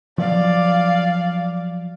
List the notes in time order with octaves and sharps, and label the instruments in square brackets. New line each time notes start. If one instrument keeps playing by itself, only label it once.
[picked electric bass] F3 F#3 [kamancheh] D5 F5